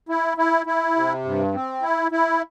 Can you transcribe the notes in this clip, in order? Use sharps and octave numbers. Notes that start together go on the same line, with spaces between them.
E4
E4
E4
C3
G2
C4
E4
E4